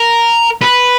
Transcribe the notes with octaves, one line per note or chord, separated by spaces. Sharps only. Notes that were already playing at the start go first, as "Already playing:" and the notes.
Already playing: A#4
B4